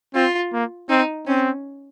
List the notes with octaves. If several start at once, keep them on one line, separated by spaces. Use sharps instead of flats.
C4 F4
A#3
C4 D#4
C4 C#4